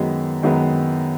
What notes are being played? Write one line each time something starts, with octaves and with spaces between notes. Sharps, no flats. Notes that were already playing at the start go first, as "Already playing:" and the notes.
Already playing: F#2 D#3 G#3 B3
F#2 D#3 G#3 B3